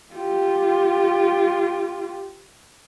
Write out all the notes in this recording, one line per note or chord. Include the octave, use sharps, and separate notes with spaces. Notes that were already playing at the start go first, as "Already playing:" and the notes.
F4 G4